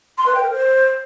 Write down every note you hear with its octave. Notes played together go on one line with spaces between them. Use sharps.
C6
B4
G5
A#4
C5